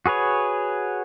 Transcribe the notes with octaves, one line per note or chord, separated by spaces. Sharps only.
F#4 G#4 B4 C#5